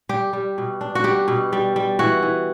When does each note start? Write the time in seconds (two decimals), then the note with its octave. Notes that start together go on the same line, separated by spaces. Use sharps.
0.09 G3 G4
0.33 G3
0.58 B2
0.81 D4
0.95 F#4
1.04 G3 G4
1.28 B2
1.53 G3
1.76 G3
1.99 E3 F#4
2.22 E3